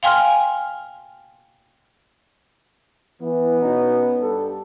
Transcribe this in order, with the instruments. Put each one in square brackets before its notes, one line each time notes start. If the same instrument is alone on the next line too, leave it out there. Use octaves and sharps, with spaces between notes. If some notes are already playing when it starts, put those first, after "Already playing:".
[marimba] F5 G5 G#5 C6 F6
[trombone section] E3 [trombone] B3
[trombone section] B2 C#4 D#4
G2 G4 A4